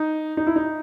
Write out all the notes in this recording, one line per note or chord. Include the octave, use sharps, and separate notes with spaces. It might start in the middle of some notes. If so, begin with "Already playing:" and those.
Already playing: D#4
D#4
E4
D#4